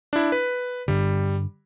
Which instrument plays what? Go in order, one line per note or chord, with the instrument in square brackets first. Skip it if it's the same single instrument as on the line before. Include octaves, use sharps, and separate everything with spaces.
[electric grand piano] D4 E4
B4
[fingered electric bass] G2 D3 [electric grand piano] G3